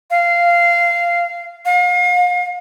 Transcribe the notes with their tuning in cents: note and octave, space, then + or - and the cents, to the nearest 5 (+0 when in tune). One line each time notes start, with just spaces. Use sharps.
F5 -15
F5 +40